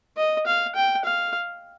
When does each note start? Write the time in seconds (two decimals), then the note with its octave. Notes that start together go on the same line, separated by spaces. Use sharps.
0.17 D#5
0.46 F5
0.76 G5
1.05 F5